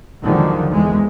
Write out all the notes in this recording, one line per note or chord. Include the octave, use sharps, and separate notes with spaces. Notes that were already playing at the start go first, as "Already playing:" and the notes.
D#2 D3 D#3 F3 F#3 G#3
E2 G#3